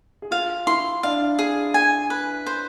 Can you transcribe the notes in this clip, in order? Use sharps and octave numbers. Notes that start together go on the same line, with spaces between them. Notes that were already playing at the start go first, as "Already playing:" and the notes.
G#4
F4 F5
E4 C6
D4 F5
G#4
G#5
B4
C5